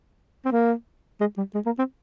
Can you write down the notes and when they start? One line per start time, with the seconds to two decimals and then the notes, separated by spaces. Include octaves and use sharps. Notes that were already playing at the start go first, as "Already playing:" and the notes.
0.45 C4
0.52 A#3
1.20 G#3
1.37 G3
1.54 G#3
1.66 A#3
1.78 C4